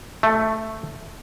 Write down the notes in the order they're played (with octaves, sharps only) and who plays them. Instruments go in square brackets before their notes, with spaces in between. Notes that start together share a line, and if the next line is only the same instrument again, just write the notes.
[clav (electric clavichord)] A3